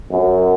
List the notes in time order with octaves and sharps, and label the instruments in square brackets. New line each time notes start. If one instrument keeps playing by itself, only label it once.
[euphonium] F#2